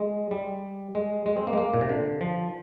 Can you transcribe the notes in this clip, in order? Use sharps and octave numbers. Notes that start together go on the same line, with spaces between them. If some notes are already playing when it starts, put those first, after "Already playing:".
Already playing: G#3
G3
G#3
G#3
C4
A#3
G#3
A#3
A#2
C3
D3
F3